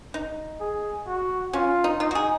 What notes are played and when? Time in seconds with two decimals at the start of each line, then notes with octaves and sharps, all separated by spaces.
0.14 D#4
0.61 G#4
1.07 F#4
1.53 C#4 F4
1.84 D#4
2.00 D#4 F4
2.11 F#4
2.15 G#4